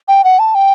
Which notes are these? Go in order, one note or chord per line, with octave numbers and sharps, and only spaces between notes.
G5
F#5
A5
G5